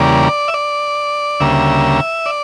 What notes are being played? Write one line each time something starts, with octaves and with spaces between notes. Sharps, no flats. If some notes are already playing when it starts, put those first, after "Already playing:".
Already playing: E2 C#3 G3 A#3 D5
E5
D5
D2 C#3 G3 A#3 E5
D5